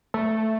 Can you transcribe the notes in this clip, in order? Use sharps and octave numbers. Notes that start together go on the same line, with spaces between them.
A3